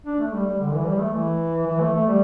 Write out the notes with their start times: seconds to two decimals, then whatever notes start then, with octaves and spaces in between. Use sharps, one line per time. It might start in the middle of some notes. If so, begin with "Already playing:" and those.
0.06 D4
0.19 A3
0.33 G3
0.47 G3
0.60 D3
0.73 E3
0.86 G3
1.00 A3
1.13 E3
1.67 E3
1.80 A3
1.94 A3
2.07 G3